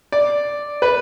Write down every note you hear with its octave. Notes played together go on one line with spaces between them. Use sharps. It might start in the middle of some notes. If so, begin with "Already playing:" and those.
D5
B4